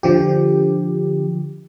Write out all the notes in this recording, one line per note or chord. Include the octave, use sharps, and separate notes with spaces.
D3 F3 G4